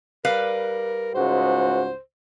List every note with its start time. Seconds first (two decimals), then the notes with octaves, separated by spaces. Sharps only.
0.25 G3 A#4 B4 F5
1.15 C#2 G#2 F#4 C5